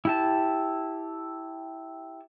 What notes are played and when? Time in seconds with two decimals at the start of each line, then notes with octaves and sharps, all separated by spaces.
0.05 E4 G4 A5